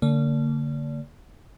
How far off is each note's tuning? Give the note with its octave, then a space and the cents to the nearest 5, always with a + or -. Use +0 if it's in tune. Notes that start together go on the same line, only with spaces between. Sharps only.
D3 -30 A#3 -30 D5 -25